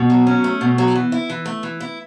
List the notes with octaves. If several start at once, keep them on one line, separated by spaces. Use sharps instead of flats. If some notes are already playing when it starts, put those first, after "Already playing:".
Already playing: B2
F#3
C#4
A3
B2
F#3
E3
E4
E3
A3
E3
E4